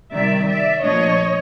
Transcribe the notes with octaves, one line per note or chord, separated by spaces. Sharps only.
C3 D#3 G3 D5 E5
D5 E5
A#2 F3 A3 D4 C#5 D#5